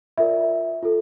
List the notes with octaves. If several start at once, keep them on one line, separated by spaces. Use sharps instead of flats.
F4 A#4 D5 E5
F4 A4